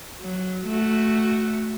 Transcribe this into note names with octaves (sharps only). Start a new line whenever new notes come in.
F#3
A3 F#4